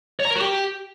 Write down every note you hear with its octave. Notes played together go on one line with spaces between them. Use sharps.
C#5
A#5
A#4
F#4
G4